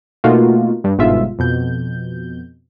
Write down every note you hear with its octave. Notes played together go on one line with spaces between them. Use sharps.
B2 A3 A#3 D#4 F4 F#4
G2
G1 G#2 B2 F4 E5
F2 B2 G6